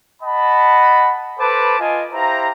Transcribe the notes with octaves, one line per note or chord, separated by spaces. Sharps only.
D#5 F#5 A5 B5
A4 B4 C5 A5 B5 D6
F4 D#5 G#5
E4 G4 C5 F5 A#5